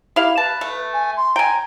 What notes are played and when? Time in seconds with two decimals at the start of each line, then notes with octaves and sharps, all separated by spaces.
0.16 E4 G4 F5
0.37 B4 A5
0.61 A3
0.93 G#5
1.17 C6
1.36 G5 G#5 A#5